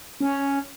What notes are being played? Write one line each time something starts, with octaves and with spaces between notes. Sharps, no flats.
C#4